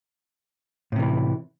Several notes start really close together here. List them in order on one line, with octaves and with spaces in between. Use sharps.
A2 C3 E3